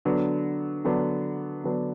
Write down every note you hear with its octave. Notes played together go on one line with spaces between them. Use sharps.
D3 F#3 B3 D4
D3 F#3 B3 D4
D3 F#3 B3 D4